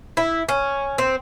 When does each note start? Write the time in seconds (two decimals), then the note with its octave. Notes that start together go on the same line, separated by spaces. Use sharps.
0.17 E4
0.49 C#4
0.98 C4